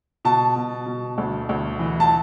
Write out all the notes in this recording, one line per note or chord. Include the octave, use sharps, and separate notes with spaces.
B2 A5
B2
B2
D2
D2
E3
A5